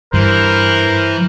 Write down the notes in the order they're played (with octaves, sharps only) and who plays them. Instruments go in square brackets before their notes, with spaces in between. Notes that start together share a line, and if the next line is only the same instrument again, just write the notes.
[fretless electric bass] G2 [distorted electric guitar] E3 [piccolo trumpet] A#4 [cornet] C5